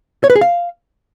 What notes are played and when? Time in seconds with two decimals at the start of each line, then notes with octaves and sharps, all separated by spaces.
0.24 C#5
0.30 B4
0.36 G#4
0.41 F5